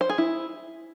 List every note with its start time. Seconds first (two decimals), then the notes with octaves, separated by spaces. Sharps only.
0.01 C5
0.09 G#4
0.18 E4